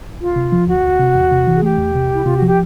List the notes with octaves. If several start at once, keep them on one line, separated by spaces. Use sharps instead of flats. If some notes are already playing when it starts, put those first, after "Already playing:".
D2 F4
C3
F3
D2 F#4
D2
C3
E2
C3
E3
G#4
A3 G4
E2
C3
C2 E4
C3 F4
F#4
F3 G4